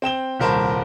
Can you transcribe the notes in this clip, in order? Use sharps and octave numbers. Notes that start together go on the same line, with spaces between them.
C4 G5 E7 G7
D#1 C2 A#4 C5 A5 B5